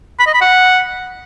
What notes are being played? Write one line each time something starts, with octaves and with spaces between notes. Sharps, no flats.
B5
D#5
B5
F#5